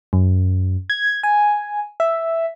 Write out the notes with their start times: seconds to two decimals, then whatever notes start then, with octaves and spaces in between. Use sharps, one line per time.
0.13 F#2
0.90 G#6
1.23 G#5
2.00 E5